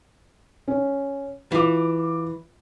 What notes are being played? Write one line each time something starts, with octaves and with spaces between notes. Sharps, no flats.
C#4
E3 F4 D6